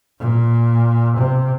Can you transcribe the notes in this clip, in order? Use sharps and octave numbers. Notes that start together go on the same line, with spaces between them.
A#2
C3